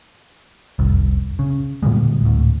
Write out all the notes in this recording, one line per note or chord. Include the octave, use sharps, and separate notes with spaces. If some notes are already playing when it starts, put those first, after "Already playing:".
F1 C2
C#3
A#2 D3 G3 G#3
D1 D2